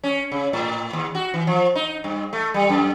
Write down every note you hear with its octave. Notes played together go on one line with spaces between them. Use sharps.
C#4
C#3
A2
D#2
F#4
E3
F3
D#4
G2
A3
G3
F#2